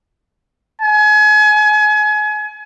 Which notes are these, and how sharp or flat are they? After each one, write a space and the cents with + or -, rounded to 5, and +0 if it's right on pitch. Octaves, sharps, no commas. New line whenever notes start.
G#5 +35